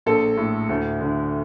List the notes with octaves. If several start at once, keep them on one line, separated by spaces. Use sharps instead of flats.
A#1 A4
A2
D2
D3